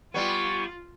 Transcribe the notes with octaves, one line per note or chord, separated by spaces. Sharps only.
G3 B3 F4 G#5 C#6